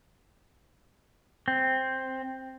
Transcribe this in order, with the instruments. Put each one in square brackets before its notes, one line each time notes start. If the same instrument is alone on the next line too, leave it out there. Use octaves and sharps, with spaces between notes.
[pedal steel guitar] C4